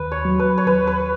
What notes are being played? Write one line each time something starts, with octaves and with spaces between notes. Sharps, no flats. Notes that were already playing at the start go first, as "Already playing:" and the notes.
Already playing: D#2 B4
C#5
F#3
B4
C#5
D#2 B4
B4